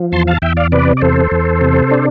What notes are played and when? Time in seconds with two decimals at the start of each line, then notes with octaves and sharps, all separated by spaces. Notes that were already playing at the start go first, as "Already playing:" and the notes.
Already playing: F3
0.12 E2 A5 C6
0.27 F5 A5
0.42 E2 E5 G5
0.57 D5 F5
0.72 C3 B4 D5
0.97 D5
1.01 E2 A4 C5
1.31 E2
1.61 C3
1.91 D4